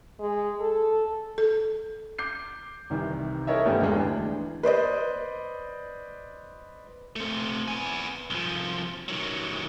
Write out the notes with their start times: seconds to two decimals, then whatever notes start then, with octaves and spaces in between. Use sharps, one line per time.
0.19 G#3
0.60 A4
1.38 A4
2.19 D6 G6 C7
2.90 C2 C3 D#3 E3
3.47 E4 A4 A#4 C#5 D#5 E5
3.66 G2 D#3 A3 B3 C#4 G4
3.82 E1 G#3 A4 G5
3.95 D2 E3 D4
4.63 B4 C5 D5 D#5
7.16 A3 C4
7.68 B3 G#5
8.30 C2 F3
9.08 D#3 F#3